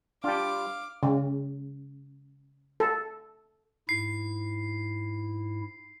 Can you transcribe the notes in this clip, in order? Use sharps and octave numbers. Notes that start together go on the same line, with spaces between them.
G3 D4 F4 F5 G5 D6
C#3
A4
G#2 E4 C7